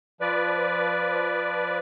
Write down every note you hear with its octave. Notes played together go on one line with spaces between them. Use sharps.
F3 B4 D5